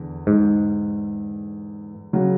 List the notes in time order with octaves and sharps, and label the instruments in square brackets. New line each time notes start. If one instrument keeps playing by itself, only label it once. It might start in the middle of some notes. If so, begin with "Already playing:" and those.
Already playing: [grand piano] E2 D3
[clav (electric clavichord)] G#2
[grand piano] C#3 F#3